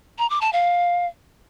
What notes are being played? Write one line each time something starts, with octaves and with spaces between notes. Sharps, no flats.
A#5
D6
A5
F5